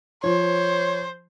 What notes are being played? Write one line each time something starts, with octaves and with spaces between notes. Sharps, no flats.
F3 C5 C#5